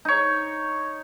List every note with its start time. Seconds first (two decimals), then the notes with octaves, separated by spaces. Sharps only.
0.05 D#4 C#5